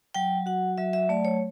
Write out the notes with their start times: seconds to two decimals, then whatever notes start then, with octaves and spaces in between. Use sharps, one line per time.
0.15 F#3 G5
0.46 F#4 F#5
0.78 F#3 E5
0.93 E5
1.09 A3 D5
1.25 C#5